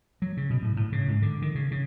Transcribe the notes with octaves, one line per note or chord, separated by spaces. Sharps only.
F#3
C#3
B2
A2
A2
C#3
G#2
D3
D#3
C#3
C#3